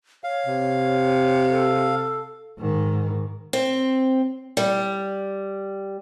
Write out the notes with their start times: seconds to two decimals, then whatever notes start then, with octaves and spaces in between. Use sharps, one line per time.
0.24 C#5 F5
0.46 C3
1.49 A4
2.58 G#2 D#3
3.53 C4
4.57 G3